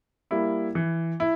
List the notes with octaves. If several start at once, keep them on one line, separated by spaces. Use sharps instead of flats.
G3 A#3 E4
E3
E4